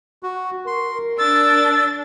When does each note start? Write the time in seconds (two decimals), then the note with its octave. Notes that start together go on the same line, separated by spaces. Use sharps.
0.23 F#4
0.67 A#4 C6
1.18 D4 E6 A6